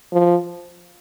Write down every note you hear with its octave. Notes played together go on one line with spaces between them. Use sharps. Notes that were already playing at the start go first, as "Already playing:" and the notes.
F3